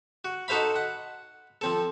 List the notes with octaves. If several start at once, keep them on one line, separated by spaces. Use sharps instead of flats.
F#4
D#4 F#4 A4 C5 F5 B5
F#5
F3 C4 A4